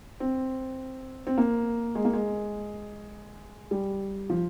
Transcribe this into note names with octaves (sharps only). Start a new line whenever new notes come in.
C4
C4
A#3
G#3
A#3
G#3
G3
F3